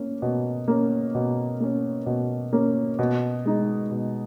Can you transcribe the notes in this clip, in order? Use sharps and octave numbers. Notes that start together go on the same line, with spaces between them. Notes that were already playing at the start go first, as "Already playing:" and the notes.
Already playing: A#3 C#4
B2
A#3 C#4
B2
A#3 C#4
B2
A#3 C#4
B2
G#3 D#4
B2